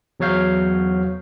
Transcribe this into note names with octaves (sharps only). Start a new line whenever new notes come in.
E2 F#3 C#5 F5 G6